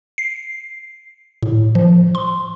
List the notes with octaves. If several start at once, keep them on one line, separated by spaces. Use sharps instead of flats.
C7
A2
F3
C6